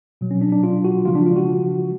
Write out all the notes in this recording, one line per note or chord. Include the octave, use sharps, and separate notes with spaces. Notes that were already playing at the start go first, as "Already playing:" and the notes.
B2 F#3
C#4
D4
D4
F4
F#4
C#3 F3 G#3 F4
D4
F4
F#4